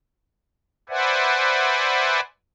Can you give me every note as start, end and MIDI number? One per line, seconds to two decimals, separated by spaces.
0.89 2.20 71
0.89 2.20 72
0.89 2.20 74
0.89 2.20 76
0.89 2.20 78
0.89 2.20 80